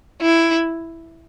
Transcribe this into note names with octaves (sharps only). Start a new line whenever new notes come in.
E4